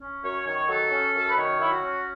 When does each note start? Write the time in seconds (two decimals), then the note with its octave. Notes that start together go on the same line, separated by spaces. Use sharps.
0.01 C#4
0.24 F#2 C#5
0.46 D#3 C#5
0.69 F#3 A4
0.92 C#4
1.15 F#2
1.30 B4
1.37 D#3 C#5
1.60 F#3 E4
1.71 F#4
1.83 C#4